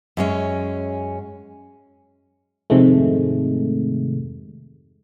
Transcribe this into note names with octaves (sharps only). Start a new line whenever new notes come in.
F#2 G#3 C#4
F2 G#2 C3 D#3 G#3 A3